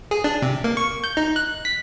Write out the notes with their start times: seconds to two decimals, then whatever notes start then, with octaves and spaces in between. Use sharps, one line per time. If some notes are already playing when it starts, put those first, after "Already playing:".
0.11 G#4
0.24 D4
0.42 C3
0.64 A#3
0.77 C#6
1.04 G6
1.17 D#4
1.36 F#6
1.65 B6